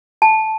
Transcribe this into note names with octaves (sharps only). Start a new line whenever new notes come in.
A5